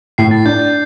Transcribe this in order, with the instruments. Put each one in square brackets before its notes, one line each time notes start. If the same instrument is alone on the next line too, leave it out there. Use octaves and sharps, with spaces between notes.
[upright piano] A2 [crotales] C7
[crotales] A6
[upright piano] D4 [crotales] G6
[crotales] G6